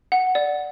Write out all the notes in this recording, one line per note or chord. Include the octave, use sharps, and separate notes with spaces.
F#5
D5